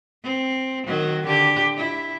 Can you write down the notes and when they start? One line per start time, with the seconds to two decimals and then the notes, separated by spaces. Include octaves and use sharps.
0.23 C4
0.86 D#3 F#3
1.26 D3 G4
1.77 E4